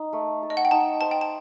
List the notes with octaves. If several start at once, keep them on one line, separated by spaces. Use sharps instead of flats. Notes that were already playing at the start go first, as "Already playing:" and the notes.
Already playing: D#4
A3
A4
D#5
F#5
G5
D#4 A5
C5 A5
G5
A5